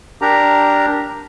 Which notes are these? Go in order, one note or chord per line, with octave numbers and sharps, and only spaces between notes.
D4 G4 A#4 A#5